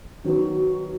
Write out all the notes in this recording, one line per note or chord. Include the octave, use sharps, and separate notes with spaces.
D#3 F#3 B3 F#4